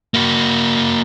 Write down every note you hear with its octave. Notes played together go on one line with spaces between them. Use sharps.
A#3 F#4